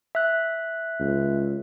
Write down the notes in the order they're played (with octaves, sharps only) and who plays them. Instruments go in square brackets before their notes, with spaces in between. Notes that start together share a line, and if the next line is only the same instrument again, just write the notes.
[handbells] E5 F#6
[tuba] C#2